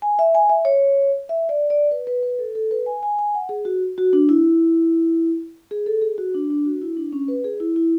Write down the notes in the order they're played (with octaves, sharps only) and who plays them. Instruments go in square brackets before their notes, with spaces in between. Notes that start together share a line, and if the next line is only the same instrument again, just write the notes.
[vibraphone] G#5
E5
G#5
E5
C#5
E5
D5
D5
B4
B4
B4
A4
A4
B4
G#5
G#5
G#5
F#5
G#4
F#4
F#4
D4
E4
G#4
A4
G#4
F#4
D4
D4
F#4
E4
D4
C#4
B4
G#4
E4
E4